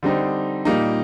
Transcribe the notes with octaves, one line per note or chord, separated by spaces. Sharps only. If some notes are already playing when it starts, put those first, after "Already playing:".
D3 G3 C4 D#4
A#2 G3 A#3 D#4